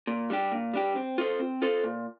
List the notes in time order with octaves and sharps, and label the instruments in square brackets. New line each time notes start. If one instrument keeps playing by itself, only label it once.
[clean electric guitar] A#2
G3 D4 G4
A#2
G3 D4 G4
C4
F4 A4 C5
C4
F4 A4 C5
A#2